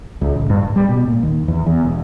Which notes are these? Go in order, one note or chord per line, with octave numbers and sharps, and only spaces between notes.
C#2
A1
G2
D1
G3
B2
A#2
D#2
E2
E2
E1